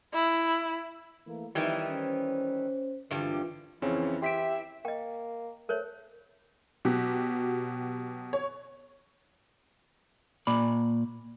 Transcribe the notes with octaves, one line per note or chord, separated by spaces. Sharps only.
E4
E3 A3 A#3
F2 D#3 E3 G3
C#4 C5
G#1 G2 D3 E3 G3 F4
F2 C#3 E3 C4 C#4
G4 E5 C6 B6 D7
A#3 D#5 G5
A3 A#4 C5 C#5
B2 F#3 G4
C#5
A#2 D5 B5